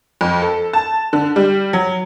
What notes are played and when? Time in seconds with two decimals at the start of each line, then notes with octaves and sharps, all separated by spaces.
0.21 F2
0.42 A4
0.73 A5
1.13 D3
1.36 G3
1.73 F#3